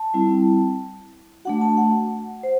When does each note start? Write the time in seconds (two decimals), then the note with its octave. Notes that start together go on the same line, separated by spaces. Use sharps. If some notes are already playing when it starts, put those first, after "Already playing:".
Already playing: A5
0.14 G3 C4 E4
1.45 A3 D4 F#4 F#5
1.61 A5
1.77 F#5
2.43 C5